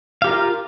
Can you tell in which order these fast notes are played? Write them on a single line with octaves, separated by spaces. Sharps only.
F5 G4 A#4 F4